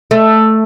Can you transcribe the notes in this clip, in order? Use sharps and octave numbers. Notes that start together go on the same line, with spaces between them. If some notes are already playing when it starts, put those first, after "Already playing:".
A3